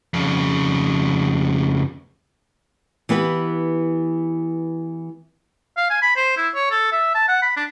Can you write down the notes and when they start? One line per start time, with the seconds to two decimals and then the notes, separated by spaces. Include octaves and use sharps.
0.14 F2 C#3
3.09 E3 B3 G4 B4
5.77 F5
5.90 G#5
6.02 B5
6.17 C5
6.37 E4
6.55 C#5
6.71 A4
6.92 E5
7.15 A5
7.28 F#5
7.42 B5
7.57 D4